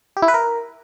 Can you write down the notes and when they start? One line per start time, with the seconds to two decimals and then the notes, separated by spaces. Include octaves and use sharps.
0.17 G4
0.22 E4
0.28 B4
0.34 A#4